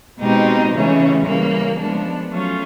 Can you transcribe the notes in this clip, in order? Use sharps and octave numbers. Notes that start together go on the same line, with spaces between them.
B2 G#3 C4 D#4 G4
C#3 E3 A3 C#4
C#3 E3 G3 A#3
F3 G#3 B3 D4
F#3 A3 C#4 F4